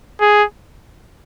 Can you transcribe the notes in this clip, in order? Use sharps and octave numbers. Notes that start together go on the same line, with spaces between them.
G#4